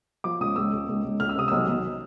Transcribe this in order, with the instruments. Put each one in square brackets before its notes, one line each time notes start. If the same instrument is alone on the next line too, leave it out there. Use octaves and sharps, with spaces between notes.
[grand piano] F3 D6
C#2 D#6
C#2 E6
C#2
C#2
C#2
C#2 F6
E6
C3 D#6
B1 E6
B1